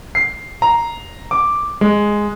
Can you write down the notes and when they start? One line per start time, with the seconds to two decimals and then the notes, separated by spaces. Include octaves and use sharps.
0.15 C7
0.62 A#5
1.31 D6
1.81 G#3